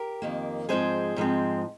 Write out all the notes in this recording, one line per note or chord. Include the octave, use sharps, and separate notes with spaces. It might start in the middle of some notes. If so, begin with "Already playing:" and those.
Already playing: G4 A#4
F2 D#3 A#3
G#2 F3 G#3 C4 G#4 C5
G#2 F3 G#3 C4